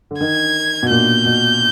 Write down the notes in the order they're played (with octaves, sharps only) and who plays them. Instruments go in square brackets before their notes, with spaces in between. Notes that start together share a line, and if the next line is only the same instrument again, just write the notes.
[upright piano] D3
[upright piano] D#3 [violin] G#6
[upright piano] B2
[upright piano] A#2 [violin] G6
[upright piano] B2